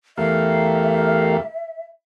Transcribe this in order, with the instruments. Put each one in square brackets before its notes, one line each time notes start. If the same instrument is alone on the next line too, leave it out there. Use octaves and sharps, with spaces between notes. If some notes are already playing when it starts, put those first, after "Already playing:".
[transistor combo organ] E2 A3 [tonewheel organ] G4 A#4 F5 [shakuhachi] E5